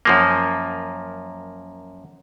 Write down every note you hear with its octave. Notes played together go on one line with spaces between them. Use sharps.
F#2 F3 A#3